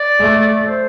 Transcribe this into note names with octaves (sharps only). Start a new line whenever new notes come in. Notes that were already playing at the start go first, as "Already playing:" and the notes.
Already playing: D5
A3
C5